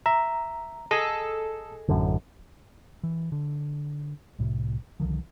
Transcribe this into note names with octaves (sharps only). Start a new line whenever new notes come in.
E5 A#5
G#4 A4 D#5
A1 F#2 D3
E3
D3
C2 A2 C3
C2 D3 D#3 F3